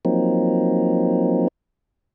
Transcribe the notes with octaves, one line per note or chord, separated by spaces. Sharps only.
F3 F#3 A#3 C4 D#4